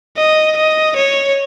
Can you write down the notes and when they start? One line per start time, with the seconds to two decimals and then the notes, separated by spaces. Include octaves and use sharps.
0.17 D#5
0.56 D#5
0.96 C#5